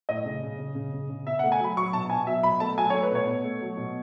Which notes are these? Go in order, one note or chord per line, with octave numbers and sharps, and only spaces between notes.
A2 D#5
C#3
C#3
C#3
C#3
C#3
C#3
B2 E5
A3 F#5
G#5
F#3 B5
F#3 C#6
B2 A5
B2 G#5
F#3 E5
B2 B5
A3 A5
F#3 G#5
A3 C#5
B4
B2 C#5
B2
A3
F#3
B2